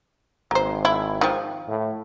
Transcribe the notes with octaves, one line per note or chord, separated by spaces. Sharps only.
G#1 A#3 C5
E4
D#3 F3
A2